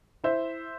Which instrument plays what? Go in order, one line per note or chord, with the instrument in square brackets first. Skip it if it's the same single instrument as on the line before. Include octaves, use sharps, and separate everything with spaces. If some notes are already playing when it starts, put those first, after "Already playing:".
[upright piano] E4 C5 E5